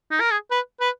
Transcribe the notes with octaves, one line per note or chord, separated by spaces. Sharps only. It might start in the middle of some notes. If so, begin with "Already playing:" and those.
D#4
A#4
G#4
B4
B4